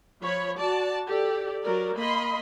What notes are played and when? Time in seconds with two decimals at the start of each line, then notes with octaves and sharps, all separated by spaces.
0.22 F3 C#5 B5
0.58 F#4 D5 A5
1.07 G4 A4 D5
1.63 F#3 A#4 D5
1.96 A#3 D#5 B5 C6